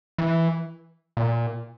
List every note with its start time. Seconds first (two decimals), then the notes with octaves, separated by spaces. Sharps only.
0.18 E3
1.17 A#2